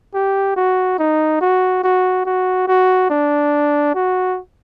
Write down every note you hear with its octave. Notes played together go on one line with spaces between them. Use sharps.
G4
F#4
D#4
F#4
F#4
F#4
F#4
D4
F#4